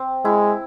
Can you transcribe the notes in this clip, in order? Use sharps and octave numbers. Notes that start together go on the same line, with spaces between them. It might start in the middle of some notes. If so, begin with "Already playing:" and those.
Already playing: C4
G#3 E4